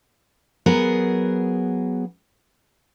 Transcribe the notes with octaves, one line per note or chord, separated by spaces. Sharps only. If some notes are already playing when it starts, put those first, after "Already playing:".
F#3 B3 G#4 A#4